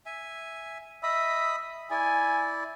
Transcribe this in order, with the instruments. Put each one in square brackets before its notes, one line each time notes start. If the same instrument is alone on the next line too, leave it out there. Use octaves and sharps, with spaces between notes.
[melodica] E5 G#5
[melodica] D#5 B5 D#6 [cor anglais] E5
[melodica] E4 D5 [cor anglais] G#5